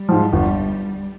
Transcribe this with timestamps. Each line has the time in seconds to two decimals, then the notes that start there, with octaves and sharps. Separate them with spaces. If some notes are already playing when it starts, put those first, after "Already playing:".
Already playing: G3
0.09 G#2 F3
0.33 G1